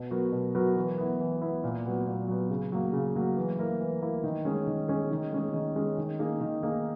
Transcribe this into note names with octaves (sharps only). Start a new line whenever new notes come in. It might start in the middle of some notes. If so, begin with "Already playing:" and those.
Already playing: B2
F#3 B3 F#4 A#4
B2
F#3 B3 F#4 A#4
E3
B3 E4
E3
B3 E4
A#2
F#3 B3
A#2
F#3 B3
C#3
F#3 A#3
C#3
F#3 A#3
E3
A#3 E4 A#4
E3
A#3 E4 A#4
D#3
G#3 C#4 G#4
D#3
G#3 C#4 G#4
D#3
G#3 C#4 G#4
D#3
G#3 C#4 G#4
D#3
A#3 D#4 G#4
D#3
A#3 D#4 G#4